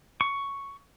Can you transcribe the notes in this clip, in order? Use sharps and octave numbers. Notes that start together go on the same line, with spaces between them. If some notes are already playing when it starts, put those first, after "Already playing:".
C#6